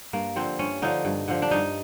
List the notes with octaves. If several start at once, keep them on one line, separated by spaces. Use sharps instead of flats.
G2 A#3
D3 F3 C4
G2 C#4
D3 F3 D#4
G2
D3 F3
D4
G2 D#4